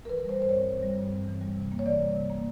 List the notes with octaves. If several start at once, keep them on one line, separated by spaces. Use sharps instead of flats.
A#4
E3 B4
G3 C5
G2 C5
C#5
C4
E3 C#5
G3
G2
C4
E3
G3
C3
A#3
C#5
E3 D5
G3
C3
A#3